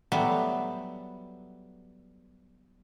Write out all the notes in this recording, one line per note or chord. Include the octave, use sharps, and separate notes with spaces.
F#3 G3 A3 B3